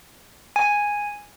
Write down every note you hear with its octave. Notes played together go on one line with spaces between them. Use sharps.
G#5